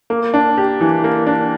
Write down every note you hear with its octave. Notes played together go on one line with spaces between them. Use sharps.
A#3
D4
G4
E3
A#3
D4